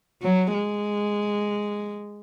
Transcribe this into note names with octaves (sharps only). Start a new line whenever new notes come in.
F#3
G#3